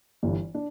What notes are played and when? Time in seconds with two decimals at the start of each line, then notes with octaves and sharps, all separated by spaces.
0.23 G1 G2 E3
0.55 D4